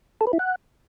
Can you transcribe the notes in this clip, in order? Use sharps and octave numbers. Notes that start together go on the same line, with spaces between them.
A4
B4
E4
F#5